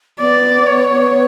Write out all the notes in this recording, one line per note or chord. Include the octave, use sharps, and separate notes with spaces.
B3 D5
C#5